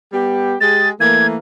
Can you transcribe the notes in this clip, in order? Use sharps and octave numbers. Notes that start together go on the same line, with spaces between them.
G3 B3 G4
G#3 G4 G#4 A6
E3 A3 A#3 G#6